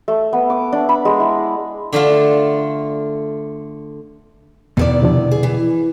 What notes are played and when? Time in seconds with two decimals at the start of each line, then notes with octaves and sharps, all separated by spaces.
0.08 A3
0.33 B3
0.50 D6
0.72 D4
0.89 B5
1.05 G#3
1.20 E4
1.93 D3 A3 D4 F4
4.77 E2 B2 D3 D#3 B3 E4 D5
5.02 C3 F3 D4
5.31 G#4
5.43 E3